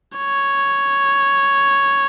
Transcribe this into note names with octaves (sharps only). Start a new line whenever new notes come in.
C#5